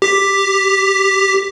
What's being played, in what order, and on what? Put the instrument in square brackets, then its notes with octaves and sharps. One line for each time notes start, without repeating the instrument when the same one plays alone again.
[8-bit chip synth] G4 B6